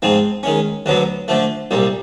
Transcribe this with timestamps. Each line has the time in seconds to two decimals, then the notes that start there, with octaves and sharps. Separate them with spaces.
0.02 G#2 F3 G#3 C4
0.43 D#3 G#3 C#4
0.86 D2 D3 F#3 B3
1.28 D3 F3 A3
1.71 C2 A#2 G3